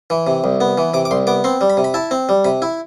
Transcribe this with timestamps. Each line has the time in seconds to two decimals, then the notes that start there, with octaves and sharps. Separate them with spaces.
0.10 E3
0.27 C3
0.44 C2
0.61 B3
0.78 E3
0.94 C3 D6
1.05 D6
1.11 C2 C6
1.27 B3 D6
1.44 C4 C6
1.61 G3
1.70 B5
1.77 C3
1.84 B5
1.94 E4 A5
2.11 C4
2.29 G3
2.44 C3 B5
2.62 E4